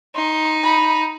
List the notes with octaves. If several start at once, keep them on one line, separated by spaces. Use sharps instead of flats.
D#4 C6
B5